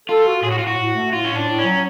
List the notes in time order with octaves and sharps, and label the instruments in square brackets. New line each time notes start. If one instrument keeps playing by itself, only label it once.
[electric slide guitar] F4 [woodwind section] A4
[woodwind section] F#4
[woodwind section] A2 [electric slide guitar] G#4
[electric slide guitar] F#4
[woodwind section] A2 [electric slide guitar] F4
[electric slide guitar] F#4
[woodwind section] A2
A3
[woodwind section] A2 [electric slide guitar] F4
[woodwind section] A2 [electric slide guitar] C#4
[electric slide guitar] D4
[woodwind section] A2
[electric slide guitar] C#4
[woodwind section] F#3